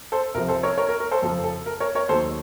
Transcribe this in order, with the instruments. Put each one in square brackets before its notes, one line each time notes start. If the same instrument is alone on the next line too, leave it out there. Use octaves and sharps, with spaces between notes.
[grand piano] A4 C5
C2 C3 F3 A#4
A4 C5
A#4 C#5
A#4 C#5
A#4
A#4
A4 C5
F2 C#3 F3 A4
A4
A#4
A#4 C#5
A#4 C#5
D#2 D#3 F#3 A4 C5